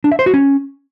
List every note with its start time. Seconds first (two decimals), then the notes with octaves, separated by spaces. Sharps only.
0.04 D4
0.12 E5
0.19 C5
0.26 F#4
0.34 C#4